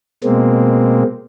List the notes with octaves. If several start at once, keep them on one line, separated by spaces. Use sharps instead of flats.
B2 G#3 A#3 C4